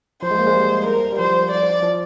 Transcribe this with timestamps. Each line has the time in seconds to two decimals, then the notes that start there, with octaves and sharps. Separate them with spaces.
0.23 F3 C5
0.31 G#3
0.38 A#3
0.47 G#3
0.55 G3
0.86 A#4
1.12 G3
1.19 F3 C5
1.51 D5
1.83 F3